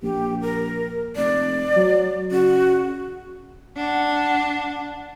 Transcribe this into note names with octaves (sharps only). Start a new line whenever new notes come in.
A#1 G4
A#4
F1 D5
F#3
C#3 F#4
D4 F#5